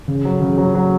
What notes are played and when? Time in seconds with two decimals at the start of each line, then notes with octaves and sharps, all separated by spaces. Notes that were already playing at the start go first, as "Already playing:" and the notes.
0.08 C#3
0.25 F#3
0.41 C#3
0.58 F#3
0.75 F#3